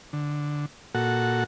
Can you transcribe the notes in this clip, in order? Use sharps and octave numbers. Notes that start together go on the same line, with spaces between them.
D3
A#2 F#4 A4 F#5